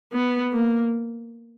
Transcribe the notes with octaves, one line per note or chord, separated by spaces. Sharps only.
B3
A#3